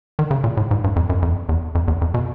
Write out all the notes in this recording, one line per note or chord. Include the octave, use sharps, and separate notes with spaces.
D#3
C#3
A#2
A2
G#2
G2
F2
F#2
F2
E2
F2
E2
F2
B2